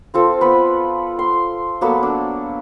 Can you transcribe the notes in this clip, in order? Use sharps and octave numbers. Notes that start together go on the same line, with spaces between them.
C4 F4 A4
B3 B4
C6
F#3 A#3 B3 A4
D4